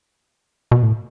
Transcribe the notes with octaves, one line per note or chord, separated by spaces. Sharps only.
B2
A2